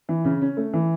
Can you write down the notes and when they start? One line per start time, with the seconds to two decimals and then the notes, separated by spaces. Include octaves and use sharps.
0.09 E3
0.25 C#3
0.42 C#4
0.57 A3
0.73 E3